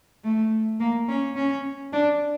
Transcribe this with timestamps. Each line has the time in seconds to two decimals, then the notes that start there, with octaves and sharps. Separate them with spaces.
0.24 A3
0.80 A#3
1.08 C#4
1.35 C#4
1.93 D4